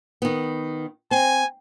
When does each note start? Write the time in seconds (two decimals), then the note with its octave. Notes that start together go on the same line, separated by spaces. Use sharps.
0.22 D#3 B3
1.11 C4 G#5